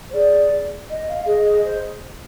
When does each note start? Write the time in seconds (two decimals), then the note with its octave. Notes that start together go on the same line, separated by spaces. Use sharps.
0.10 C5
0.14 G#4 D5
0.90 D#5
1.08 F5
1.26 G#4 D#5
1.45 D#5
1.64 C5